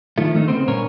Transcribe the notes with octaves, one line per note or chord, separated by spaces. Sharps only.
D#3 F3 A3
D#3 A3 D#4
D2 C#3 B3 C4 C5
G2 A#2 D3 B3 A#4 C#5